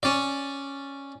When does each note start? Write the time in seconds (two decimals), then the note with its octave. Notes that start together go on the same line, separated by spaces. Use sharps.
0.03 C#4 D5